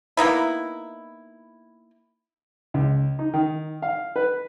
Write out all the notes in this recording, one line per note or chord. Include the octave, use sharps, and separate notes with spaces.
A#3 B3 D#4 E4
C#2
D#4
D#3
F5
B4